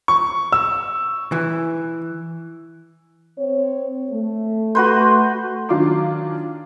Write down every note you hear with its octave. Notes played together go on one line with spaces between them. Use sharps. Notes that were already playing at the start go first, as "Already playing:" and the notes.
C#6
E6
E3
C4 C#5
A3
F#4 B4 C5
D#3 F#3 D4 F4 D6 C7